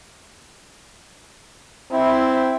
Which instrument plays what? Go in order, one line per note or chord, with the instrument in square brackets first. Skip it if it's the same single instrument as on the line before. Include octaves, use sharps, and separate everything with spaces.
[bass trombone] C4 [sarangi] E4